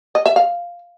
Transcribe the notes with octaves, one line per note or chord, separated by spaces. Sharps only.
D#5
E5
F5